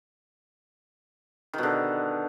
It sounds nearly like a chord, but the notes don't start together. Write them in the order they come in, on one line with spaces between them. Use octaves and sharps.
D#3 B2 D3